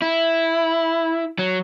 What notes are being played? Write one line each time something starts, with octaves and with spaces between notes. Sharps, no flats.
E4
F#3